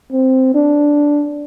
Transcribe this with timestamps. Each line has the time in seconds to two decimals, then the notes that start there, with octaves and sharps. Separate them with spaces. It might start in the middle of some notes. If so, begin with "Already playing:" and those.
0.12 C4
0.55 D4